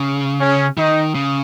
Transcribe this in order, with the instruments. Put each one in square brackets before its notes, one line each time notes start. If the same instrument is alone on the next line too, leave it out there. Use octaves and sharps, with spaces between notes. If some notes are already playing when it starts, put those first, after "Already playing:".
Already playing: [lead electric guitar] C#3
[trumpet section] C#4
[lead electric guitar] D#3 [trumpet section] D#4
[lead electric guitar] C#3